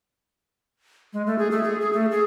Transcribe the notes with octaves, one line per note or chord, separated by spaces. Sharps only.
G#3
A3
G#4
A3
G#4
G#4
A3
G#4